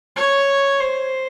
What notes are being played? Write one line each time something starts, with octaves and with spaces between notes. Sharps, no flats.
C#5
C5